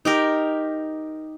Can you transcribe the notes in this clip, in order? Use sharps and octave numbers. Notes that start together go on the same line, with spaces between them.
D#4 G4 A#4